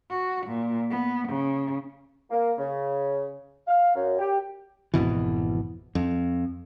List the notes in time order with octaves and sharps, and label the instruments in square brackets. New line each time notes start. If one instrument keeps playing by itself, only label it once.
[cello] F#4
A#2
B3
C#3
[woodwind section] A#3
C#3
F5
F#2
G4
[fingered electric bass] G#1 F2 B2 E3
F2